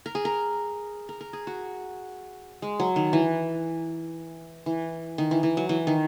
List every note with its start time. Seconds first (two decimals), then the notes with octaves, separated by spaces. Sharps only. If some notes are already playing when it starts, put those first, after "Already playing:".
0.06 A#4
0.15 G#4
0.25 A#4
1.09 A#4
1.21 A#4
1.33 G#4
1.47 F#4
2.62 G#3
2.80 F#3
2.96 D#3
3.13 E3
4.66 E3
5.18 D#3
5.31 E3
5.43 E3
5.57 F#3
5.69 E3
5.87 D#3